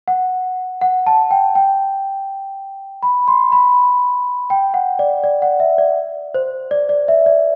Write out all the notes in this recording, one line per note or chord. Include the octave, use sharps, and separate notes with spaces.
F#5
F#5
A5
G5
G5
B5
C6
B5
G5
F#5
D5
D5
F#5
E5
D5
C5
D5
D5
E5
D5